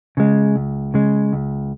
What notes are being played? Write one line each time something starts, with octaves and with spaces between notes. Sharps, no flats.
C#3 G#3
C#2
C#3 G#3
C#2